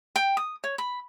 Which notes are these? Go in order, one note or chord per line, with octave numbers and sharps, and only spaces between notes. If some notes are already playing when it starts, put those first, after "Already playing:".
G5
D#6
C#5
B5